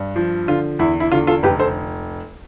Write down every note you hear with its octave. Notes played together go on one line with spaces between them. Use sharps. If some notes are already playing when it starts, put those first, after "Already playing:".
Already playing: G2
F3
D3 F4
E2 E4
E4
D3 F4
F4 A4
F1 G4 B4
A4 C5